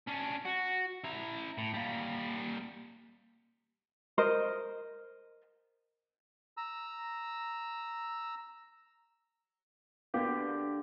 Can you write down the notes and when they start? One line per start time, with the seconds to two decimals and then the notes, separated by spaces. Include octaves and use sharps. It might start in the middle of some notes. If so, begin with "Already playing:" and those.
0.07 C#4 D4
0.45 F#4
1.04 E4 A#5
1.58 A2
1.74 G3 A#3
4.18 A#4 C5 D#5
6.57 A#5 E6
10.14 D3 A#3 B3 G4